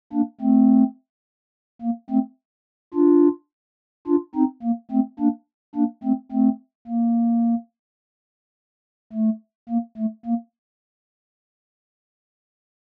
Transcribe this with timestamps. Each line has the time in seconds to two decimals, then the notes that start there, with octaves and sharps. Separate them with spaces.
0.13 A#3 D4
0.41 A3 C4
1.82 A#3
2.10 A3 C4
2.94 D4 F4
4.07 D4 F4
4.35 C4 D#4
4.63 A#3
4.91 A3 C4
5.20 A#3 D4
5.75 A#3 D4
6.03 A3 C4
6.32 A3 C4
6.87 A#3
9.13 A3
9.69 A#3
9.97 A3
10.26 A#3